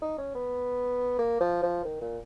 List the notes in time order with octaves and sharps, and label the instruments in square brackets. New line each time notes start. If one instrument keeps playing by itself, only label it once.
[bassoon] D#4
C#4
B3
A#3
F3
F3
D#3
A#2